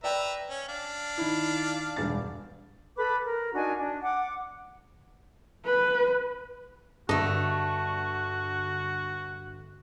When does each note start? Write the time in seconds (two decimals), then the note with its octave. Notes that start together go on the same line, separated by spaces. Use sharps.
0.04 B4 D5 E5 G5 A#5
0.49 C#4
0.69 D4 F5
1.18 D#3 E4
1.96 E1 G2 A6
2.96 A4 B4 B5 D6
3.25 A#4
3.54 D4 D#4 F#4 G#5
3.78 D4
4.03 F#5 D6
5.65 B4
7.09 G2 D3 A3 F#4 A4 D#5